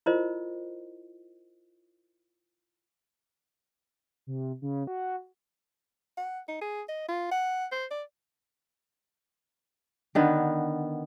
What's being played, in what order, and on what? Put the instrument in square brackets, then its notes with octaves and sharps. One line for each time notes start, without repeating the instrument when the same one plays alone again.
[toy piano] E4 F4 A#4 C5 D#5
[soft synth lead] C3
C#3
F#4
[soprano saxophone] F#5
D#4
G#4
D#5
F4
F#5
C5
D5
[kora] D3 D#3 B3